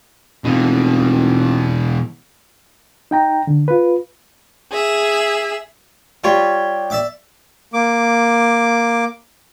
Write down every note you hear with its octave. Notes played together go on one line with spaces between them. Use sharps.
F1 B2 E3
D#4 G5 A#5
D3
F4 B4
G#4 E5
G3 F4 G4 C#5
D5 E5 D6
A#3 D6